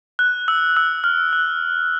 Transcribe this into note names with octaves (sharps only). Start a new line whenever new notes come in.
F#6
E6
E6
F6
F#6